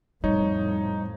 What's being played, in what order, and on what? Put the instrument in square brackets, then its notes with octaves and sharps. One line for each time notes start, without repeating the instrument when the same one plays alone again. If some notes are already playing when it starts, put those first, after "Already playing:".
[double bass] F2 A2 [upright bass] G3 [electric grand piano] D#4 C#5